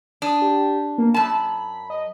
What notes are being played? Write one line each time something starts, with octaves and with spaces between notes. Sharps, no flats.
D4 D#6
G4
A#3
F#2 A5 B5
D#5